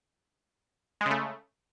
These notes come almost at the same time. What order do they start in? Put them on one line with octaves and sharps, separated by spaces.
G#3 C#3 A3